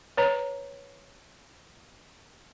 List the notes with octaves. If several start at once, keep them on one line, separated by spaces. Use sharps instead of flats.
B4 C#5 A#5